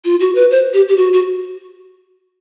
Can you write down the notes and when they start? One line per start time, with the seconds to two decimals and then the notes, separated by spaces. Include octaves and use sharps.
0.05 F4
0.20 F#4
0.35 B4
0.51 C5
0.73 G4
0.89 G4
0.97 F#4
1.13 F#4